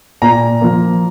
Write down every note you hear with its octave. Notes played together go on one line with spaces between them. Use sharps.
A#2 A#5
F3 A#3